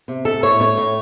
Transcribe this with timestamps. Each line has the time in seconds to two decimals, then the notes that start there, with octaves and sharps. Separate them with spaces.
0.08 C3
0.25 A3 A4
0.43 A2 C#5
0.60 A3 C#5
0.77 A2